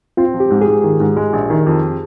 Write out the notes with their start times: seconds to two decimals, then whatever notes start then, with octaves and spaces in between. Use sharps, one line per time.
0.17 C4 F4
0.34 F3
0.40 G4
0.51 G#2
0.62 G#4
0.67 G#2
0.84 D#3
1.00 G#2
1.17 G#3
1.33 A#1
1.50 D#3
1.66 F2